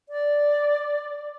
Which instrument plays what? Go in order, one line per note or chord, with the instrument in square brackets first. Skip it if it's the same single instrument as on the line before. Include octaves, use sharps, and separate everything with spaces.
[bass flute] D5